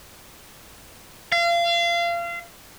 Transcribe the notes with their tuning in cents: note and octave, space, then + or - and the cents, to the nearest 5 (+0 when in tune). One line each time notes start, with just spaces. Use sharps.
F5 -30